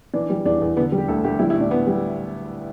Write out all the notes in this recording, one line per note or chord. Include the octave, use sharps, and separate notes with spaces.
E3 D4
G3
E2 D4
E2
D3 B3
G3
G4
D2 A4
D2 G4
G3 E4
E4
A2
D4
A2 B3
G3